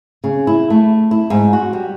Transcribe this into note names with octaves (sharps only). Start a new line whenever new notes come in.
C#3
E4
A3
E4
G#2
F#4
G3